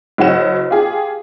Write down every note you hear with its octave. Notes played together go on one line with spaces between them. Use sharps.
F#1 F#3 F#5 E7
F4 G4 G#4